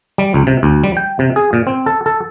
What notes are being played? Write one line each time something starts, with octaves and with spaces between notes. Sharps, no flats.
G3
C#2
C3
D2
G3
G5
C3
G#4
A#2
C4
A4
A4